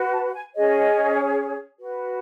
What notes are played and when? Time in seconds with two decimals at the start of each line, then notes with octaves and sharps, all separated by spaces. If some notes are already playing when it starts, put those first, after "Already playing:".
Already playing: F#4 B4
0.13 A5
0.28 F#5
0.34 G#5
0.55 C#4 G#4 C#5 D#5
1.80 F#4 B4